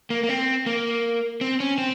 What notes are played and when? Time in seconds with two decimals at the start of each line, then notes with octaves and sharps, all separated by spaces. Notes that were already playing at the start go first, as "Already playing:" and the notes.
0.10 A#3
0.23 A#3
0.29 C4
0.66 A#3
1.41 C4
1.60 C#4
1.78 C4